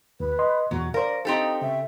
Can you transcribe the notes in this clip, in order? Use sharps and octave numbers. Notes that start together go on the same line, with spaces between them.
D#2 B4
D#5 C6
E2 B2 F#3 F#4
A#4 C5 D5 F5
C4 D#4 G4 A4
C#3 E5